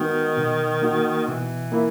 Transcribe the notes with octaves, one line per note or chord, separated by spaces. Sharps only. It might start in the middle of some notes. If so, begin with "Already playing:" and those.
Already playing: D#3 G#3 B3 D#4 F#4
B2
A#3 D#4 F#4
B2 E3
A#3 E4